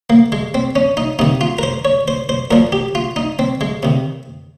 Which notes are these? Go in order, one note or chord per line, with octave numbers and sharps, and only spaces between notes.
A#3
G#3
C4
C#4
D#4
C3 D#3 D#4
F4
A#4
C5
C#5
C5
C5
A#2 F3 A#4
G4
F4
D#4
C4
G#3
C3 D#3